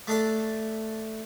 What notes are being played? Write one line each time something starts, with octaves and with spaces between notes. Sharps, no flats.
A3 D4 A4